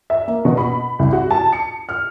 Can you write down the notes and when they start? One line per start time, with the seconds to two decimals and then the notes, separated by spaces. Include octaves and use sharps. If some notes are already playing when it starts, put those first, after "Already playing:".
0.10 E5
0.27 A#3
0.45 B2
0.57 B5
0.99 C2
1.13 F#4
1.31 A5
1.52 C#7
1.89 F6